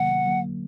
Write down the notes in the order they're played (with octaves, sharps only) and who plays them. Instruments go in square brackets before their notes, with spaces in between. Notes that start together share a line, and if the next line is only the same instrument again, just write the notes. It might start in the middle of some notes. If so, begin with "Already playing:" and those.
Already playing: [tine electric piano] C3 D#3 F#3 A#3 [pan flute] F#5
[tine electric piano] D3 F#3 A#3